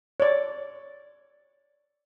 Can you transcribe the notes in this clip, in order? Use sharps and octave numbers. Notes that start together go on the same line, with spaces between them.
C#5 D5